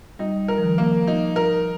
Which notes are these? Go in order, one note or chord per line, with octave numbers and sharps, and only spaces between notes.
G3 D#4
A#4
F3
D#3
A#3
D#4
A#4